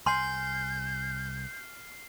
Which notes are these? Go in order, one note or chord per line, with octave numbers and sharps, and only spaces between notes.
C2 G#5 C6 F6 G6 C7